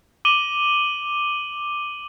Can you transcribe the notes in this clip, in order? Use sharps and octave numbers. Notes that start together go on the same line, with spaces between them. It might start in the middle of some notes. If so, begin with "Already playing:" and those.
D6 D#7 F#7 G7